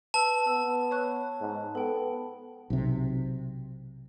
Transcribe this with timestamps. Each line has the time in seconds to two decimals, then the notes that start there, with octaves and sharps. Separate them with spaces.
0.14 B4 A5 E6
0.47 B3 E6
0.91 C#5 C#6 F#6
1.41 G#2
1.75 B3 A4 G5
2.70 B1 C3